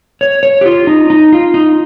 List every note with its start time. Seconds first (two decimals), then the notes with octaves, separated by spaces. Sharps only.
0.21 C#5
0.43 C#5
0.61 G4
0.66 F4
0.87 D#4
1.10 D#4
1.32 F4
1.54 D#4